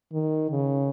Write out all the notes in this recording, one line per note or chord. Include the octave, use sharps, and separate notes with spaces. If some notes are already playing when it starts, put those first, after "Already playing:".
D#3
C#3